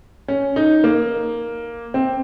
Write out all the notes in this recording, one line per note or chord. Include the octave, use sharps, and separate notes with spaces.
C#4
D#4
A#3
C4